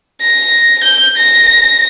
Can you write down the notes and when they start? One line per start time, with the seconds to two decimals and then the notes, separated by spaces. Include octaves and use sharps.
0.22 A#6
0.84 G6
1.17 A#6